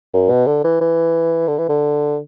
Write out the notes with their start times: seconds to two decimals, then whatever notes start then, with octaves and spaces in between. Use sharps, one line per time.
0.13 F#2
0.30 B2
0.46 D3
0.64 E3
0.81 E3
1.48 D3
1.58 E3
1.69 D3